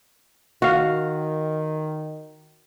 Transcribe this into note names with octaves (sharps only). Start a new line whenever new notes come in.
D#3 F#4 F5